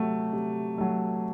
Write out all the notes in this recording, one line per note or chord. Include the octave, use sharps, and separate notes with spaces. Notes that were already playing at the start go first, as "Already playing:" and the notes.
Already playing: C3 F#3 A3
C3
F#3 A3